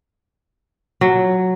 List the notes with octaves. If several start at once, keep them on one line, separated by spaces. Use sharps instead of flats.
F#3